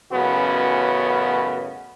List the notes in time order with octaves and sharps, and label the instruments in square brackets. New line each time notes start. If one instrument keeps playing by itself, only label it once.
[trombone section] A1 F#2 C#3 B3 F#4